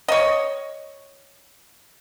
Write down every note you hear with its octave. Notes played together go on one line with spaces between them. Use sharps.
C#5 D#5